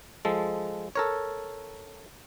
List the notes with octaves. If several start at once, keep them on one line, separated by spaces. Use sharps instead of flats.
F3 G#3 A4
A4 A#4 C#5